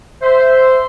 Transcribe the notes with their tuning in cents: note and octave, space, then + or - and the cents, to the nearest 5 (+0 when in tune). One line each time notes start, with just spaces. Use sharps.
C5 -10 E5 +0